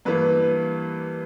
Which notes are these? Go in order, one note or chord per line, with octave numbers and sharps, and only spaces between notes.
G2 E3 A#3 B4